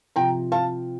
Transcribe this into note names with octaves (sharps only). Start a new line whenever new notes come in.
C3 F3 G5 A#5
F5 A5